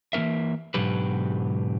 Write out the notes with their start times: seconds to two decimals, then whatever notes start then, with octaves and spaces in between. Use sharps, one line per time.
0.13 E3 A#3 C#4 A#4 E5
0.74 G#2 B2 D3 F#3 G4 B4